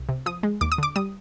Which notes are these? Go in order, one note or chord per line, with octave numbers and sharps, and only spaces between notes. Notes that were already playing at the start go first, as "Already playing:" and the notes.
Already playing: C2
C3
F3 D#6
G#3
D#2 D6
D#6
D3 D6
G3 D#6